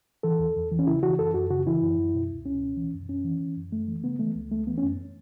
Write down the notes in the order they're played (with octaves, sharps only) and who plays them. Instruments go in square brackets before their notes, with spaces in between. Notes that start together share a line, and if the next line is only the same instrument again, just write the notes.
[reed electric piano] E3 A4
E2
E2
E3
C#4
C#3 E4
E3 F#4
F#2 A4
F#2 F#4
C#3 F#4
E3 E4
F#2
F#2
B2
C#2
C#2 C#4
B2
E3
F#2
F#2 C#4
E3
E3
F#2
F#2 A3
E3
C#3 B3
E3 A3
C#2
C#2 A3
E3 B3
C#4
F#2